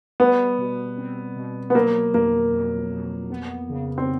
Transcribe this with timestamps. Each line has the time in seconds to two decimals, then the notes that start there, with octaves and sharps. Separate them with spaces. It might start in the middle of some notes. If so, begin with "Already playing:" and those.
0.20 G3 B3
0.58 B2
0.98 C4
1.36 B2
1.70 B3
1.75 F#3 A#3
2.14 F2 A#3
2.53 F2
2.91 F2
3.30 B3
3.69 C#3
3.98 C4